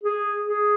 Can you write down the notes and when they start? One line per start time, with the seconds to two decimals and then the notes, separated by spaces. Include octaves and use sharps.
0.03 G#4
0.46 G#4